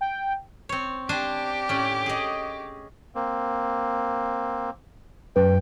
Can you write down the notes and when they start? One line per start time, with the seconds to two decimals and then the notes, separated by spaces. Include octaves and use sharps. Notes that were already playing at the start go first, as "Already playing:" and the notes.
0.01 G5
0.69 C4 C#5
1.09 D4 G4 C5 G#5
1.69 A2 C#4
2.06 G#4 D#5
3.15 A#3 C4
5.36 F#2 B4 G5